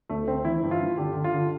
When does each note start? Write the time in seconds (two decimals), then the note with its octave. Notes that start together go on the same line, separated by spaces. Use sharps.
0.10 D2 A3
0.27 D2 C4
0.45 E3 E4
0.63 G2
0.71 F4
0.81 G2
0.98 D3 G4
1.15 D3
1.24 F4
1.33 D3